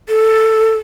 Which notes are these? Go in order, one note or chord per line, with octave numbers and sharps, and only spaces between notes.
A4